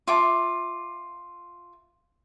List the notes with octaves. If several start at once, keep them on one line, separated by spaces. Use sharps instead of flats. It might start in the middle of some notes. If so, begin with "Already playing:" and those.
F4 E5 A5 D6